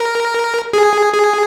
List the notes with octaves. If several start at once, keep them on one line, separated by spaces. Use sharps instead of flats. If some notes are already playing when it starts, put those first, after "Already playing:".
Already playing: A#4
G#4
G#4